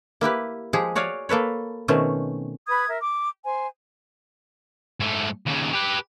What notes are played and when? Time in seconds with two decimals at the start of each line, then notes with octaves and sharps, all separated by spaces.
0.21 A#3 E4 G4 B4
0.73 F3 G#3 G4 G#4
0.95 F#4 C#5 D5 F5 G#5
1.29 A#3 A4 B4 C#5
1.88 B2 D#3 A3 C4 C#4
2.68 B4 B5 D#6 G#6
2.88 A#4 E5
3.02 D6
3.44 C5 G#5
5.00 G#2 A3
5.47 D#2 C#3
5.74 G4 B4